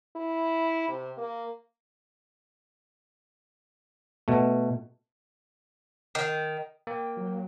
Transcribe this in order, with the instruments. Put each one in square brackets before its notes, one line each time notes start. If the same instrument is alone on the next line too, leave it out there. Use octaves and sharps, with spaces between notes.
[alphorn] E4
C3
A#3
[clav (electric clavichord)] B2 A3
[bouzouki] D#3
[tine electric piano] A#3 [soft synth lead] G5
[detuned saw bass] F#3